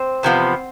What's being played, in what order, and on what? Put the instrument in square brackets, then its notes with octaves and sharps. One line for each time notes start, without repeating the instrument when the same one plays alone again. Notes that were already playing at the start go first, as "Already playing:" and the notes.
Already playing: [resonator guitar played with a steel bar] C4 C5
E2 C3 F3 B3